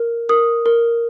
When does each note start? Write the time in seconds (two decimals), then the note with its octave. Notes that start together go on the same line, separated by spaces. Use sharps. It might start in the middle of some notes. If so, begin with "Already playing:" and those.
Already playing: A#4
0.29 A#4 D#6
0.66 A#4